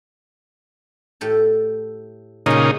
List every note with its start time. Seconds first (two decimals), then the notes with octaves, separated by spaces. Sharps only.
1.21 A2 G4 A4
2.46 A#2 C#3 G#3 D#4 G4